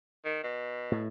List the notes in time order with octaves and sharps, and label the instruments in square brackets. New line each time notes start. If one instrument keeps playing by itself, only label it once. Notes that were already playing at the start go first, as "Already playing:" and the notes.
[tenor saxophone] D#3
B2
[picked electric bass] A2